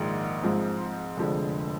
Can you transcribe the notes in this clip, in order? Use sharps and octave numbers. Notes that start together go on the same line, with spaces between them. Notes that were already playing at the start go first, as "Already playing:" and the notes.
Already playing: A#1 G#2 D#3 G#3
G#2 F3 G#3 C4
F1 F2 D3 F3 G#3